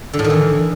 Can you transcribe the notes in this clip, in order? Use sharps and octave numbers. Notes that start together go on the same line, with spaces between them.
D3
A2
D#3
E3